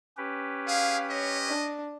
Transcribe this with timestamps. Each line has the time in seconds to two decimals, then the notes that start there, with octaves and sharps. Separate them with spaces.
0.17 C#4 G4 B4
0.67 G#4 F5
1.09 C#5 D#5
1.48 D4